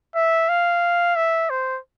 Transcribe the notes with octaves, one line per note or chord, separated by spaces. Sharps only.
E5
F5
E5
C5